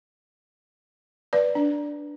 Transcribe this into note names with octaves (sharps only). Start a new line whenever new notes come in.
B4 D5
D4